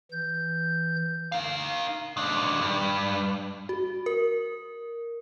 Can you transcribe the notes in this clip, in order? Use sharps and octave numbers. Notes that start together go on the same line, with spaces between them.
E3 G6
D#4 F5
D#3 D4
G2
F#4
A#4